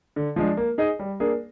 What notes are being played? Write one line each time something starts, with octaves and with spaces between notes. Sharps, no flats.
D3
F3 G#3 D4
A#3
D#4 G#4 D#5
G3
A#3 D4 G#4